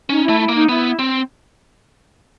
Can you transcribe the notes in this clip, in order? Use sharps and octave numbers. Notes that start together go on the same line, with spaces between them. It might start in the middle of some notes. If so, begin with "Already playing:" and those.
C#4 D#4
E4
A3
E4
A#3 D#4
B3 E4
C4